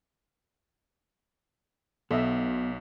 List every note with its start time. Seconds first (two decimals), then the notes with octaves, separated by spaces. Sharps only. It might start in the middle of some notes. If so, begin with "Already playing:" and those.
2.11 B1 B2 A4 D#5 E5